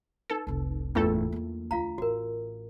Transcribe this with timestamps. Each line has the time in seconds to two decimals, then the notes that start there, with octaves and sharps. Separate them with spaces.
0.30 D#4 A4 B4
0.47 F1 C2
0.95 F#1 E2 A2 A3 D4 F4 A4
1.32 F#3 A#3
1.71 D2 F4 F5 A#5
1.98 A1 F#4 A#4